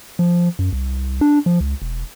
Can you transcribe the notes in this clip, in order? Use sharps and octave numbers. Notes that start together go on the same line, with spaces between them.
F3
F#2
C2
D4
F3
C#2
E1